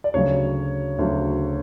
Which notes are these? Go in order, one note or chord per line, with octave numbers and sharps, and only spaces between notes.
D5
D2 C#3 F#3 C#5
D2 C#3 F#3